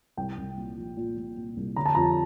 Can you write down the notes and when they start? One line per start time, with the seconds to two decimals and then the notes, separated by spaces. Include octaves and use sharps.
0.17 C2 G5
0.37 C2
0.57 A#2
0.77 F3
0.97 A#2
1.17 A#2
1.37 A#2
1.57 C2
1.76 D3 A#5
1.86 A5
1.95 F2 A#5